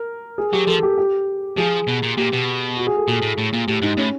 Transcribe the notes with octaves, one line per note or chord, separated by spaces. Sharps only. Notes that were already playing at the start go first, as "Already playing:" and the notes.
Already playing: A#4
G#4
F#3 G4
F3 A4
G4
G4
F3 G#4
B2
A#2
A#2 G4
B2
F#4
G#4
A4
A#2 G#4
A2
A2
A#2
A2 G4
G#2 D#4
A2 C#4